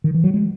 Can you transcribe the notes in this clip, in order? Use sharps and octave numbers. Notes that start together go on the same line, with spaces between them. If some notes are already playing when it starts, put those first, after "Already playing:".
D#3
E3
F#3
G#3